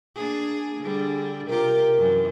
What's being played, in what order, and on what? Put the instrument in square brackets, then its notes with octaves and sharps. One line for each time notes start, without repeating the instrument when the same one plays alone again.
[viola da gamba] A#3 D4 G#4
[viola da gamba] D3 G3 [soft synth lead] G#4
[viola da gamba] C3 F4 G4 [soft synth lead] A#4
[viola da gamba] F#2 E3